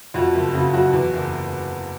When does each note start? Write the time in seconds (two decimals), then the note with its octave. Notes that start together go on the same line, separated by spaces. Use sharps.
0.14 F2 F#4
0.34 F#1
0.54 C#3 F#4
0.73 F#3 F#4
0.93 E2
1.13 F#1